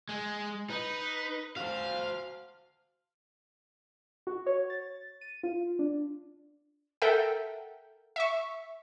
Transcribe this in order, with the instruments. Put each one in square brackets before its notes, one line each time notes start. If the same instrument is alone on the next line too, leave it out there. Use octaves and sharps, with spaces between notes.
[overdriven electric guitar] G#3
[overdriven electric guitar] D#4 [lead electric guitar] B4
[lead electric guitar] F#4 C5 [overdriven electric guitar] F5
[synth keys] F#4
C#5
A6
D#7
F4
D4
[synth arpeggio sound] A4 A#4 E5 F#5 G5
E5 C#6